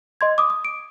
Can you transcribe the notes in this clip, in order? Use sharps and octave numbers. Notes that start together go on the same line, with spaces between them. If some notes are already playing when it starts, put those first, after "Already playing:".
D#5 C6 G#6
D6 D#6
D#6
D7